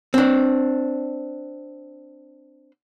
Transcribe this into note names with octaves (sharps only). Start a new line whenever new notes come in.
C4 D4